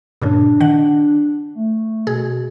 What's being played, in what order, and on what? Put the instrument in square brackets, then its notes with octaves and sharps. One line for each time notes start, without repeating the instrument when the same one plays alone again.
[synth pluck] G2 A#2 C#3 [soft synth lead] D4
[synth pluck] D#3 F#5
[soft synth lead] A3
[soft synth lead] B2 [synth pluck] G#4